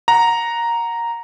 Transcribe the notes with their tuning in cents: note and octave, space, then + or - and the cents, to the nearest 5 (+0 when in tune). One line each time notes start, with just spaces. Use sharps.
F#5 +0 A#5 +0